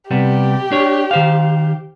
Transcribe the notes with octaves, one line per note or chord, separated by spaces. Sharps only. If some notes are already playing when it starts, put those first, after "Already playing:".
C3 G3 B3 G4
D4 C#5
D#3 C5 F5